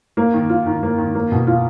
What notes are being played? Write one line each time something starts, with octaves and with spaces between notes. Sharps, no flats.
A#3
D#3
F4
D#3
A#3
D#3
A#3
B2
F4